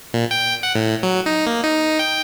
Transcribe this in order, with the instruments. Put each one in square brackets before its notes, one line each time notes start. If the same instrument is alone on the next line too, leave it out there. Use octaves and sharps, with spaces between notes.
[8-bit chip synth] A#2
G5
F#5
A2
F#3
D#4
A#3
D#4
G5